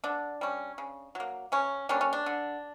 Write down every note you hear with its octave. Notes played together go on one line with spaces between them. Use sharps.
D3 D4
G3 C#4
C#3
F#3 A#3
C#3 C#4
G3 A#3 C#4 D4
C#4
D4
D3